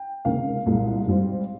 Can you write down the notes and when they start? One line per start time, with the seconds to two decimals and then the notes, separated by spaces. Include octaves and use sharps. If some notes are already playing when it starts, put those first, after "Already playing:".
Already playing: G5
0.25 C#2 C3 D#3 A#3 F5
0.66 C2 A#2 G#3
1.07 G#2 G3 C4